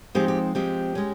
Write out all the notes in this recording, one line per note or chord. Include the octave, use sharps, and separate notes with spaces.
F3 G#3 C4 D#4 G4
G4
F3 G#3 C4 G4
G#3 C#4